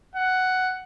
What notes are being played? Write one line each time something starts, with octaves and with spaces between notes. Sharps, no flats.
F#5